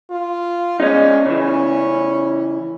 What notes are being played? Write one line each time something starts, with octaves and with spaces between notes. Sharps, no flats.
F4
G#3 C#4 D#4
C#3 E3 C#4